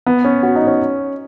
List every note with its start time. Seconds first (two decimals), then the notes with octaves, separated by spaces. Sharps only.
0.07 B3
0.25 C#4
0.43 F#4
0.56 D#4
0.67 C#4